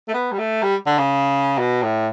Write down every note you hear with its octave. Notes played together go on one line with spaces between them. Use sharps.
A3
B3
G3
A3
G3
D3
C#3
B2
A2